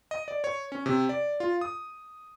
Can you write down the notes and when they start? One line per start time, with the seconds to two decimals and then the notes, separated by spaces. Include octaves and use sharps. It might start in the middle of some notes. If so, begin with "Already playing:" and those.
0.11 D#5
0.28 D5
0.44 C#5
0.72 C#4
0.86 C3
1.09 D5
1.40 F4
1.61 D#6